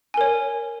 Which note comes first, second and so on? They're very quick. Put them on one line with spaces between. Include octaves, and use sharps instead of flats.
G#5 A#4 C#5